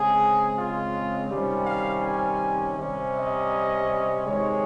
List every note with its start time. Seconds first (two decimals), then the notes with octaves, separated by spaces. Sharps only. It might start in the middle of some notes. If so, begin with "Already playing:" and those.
Already playing: C#3 G#3 C4 G#4
0.55 F4
1.29 C3 D#3 G3 C#4
1.66 F5
2.03 G#5
2.77 C3 G3 C#4
3.15 D#5
4.26 C3 D#3 G#3 C#5